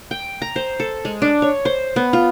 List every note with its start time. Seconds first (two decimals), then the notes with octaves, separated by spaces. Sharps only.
0.11 G5
0.42 A#5
0.56 C5
0.80 A4
1.05 G#3
1.22 D4
1.42 C#5
1.65 C5
1.96 B3
2.13 F4